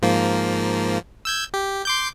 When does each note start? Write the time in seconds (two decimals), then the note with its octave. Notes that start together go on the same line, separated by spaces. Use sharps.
0.02 G#2 F3 A#3
1.25 E6 G6 G#6
1.54 G4
1.85 C6 D6 G6